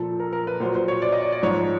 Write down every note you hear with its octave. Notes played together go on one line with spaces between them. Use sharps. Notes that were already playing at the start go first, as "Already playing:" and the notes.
Already playing: A#2 F3 A4
A#4
A#4
B4
A#2 F#3 C5
C5
C#5
D5
D#5
D5
D5
G#2 F3 C#5